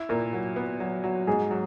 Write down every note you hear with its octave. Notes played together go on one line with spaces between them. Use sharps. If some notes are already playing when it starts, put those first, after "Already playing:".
Already playing: E4
A#2 A#4
F#3
B3
F#3
F#3
G#2 G#4
F#3